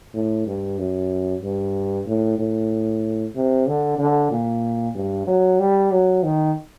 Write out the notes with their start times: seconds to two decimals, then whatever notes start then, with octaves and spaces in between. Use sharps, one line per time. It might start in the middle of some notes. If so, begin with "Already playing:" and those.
0.14 A2
0.47 G2
0.78 F#2
1.42 G2
2.07 A2
2.39 A2
3.35 C3
3.67 D3
3.98 D3
4.31 A#2
4.95 G2
5.27 F#3
5.59 G3
5.92 F#3
6.23 D#3